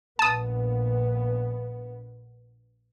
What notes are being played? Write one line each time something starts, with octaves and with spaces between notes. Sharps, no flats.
A#1 B3 A5 D#6